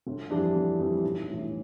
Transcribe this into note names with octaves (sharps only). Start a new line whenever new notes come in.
G1
F2 E3 G3 D4
G1
F2 E3 G3 D4
B1
A2 E3